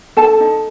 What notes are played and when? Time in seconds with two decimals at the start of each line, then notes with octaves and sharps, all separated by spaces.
0.17 D#4 A4 A5
0.40 D#4